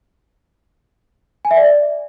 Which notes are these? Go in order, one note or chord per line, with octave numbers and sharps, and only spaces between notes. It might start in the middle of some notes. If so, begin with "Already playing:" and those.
G#5
E5
D5